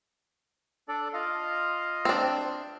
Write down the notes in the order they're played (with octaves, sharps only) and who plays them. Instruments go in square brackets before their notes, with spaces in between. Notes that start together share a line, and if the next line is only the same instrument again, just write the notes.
[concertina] D4 A4 D5
F4 D#5 F5
[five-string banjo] C4 D4